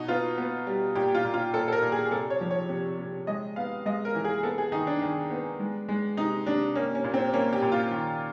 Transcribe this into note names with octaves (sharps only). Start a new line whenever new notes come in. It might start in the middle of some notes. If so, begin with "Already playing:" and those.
Already playing: B2 D#4
B3 F4
B3
G3
A#2 G4
F4
A#2
F4
A#2 A4
A4
A#4
A#2
G#4
C3 A4
C#5
F3
C#5
C3
C3
G#3 D#5
B3 F5
G#3 D#5
A#4
E3
G#4
B3 A4
G#4
D#3 D#4
D4
D#3
B3
G#3
G#3
C3 D#4
C3 D4
A#3 C#4
C#4
A#2
C4
A#3 C#4
G4
A#2
F4
D#3